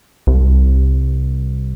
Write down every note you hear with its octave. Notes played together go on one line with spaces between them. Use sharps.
C2